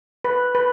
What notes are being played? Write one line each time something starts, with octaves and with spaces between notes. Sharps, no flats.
B4
B4